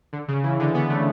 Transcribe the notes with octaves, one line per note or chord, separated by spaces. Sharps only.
D3
C#3
E3
D3
B3
A3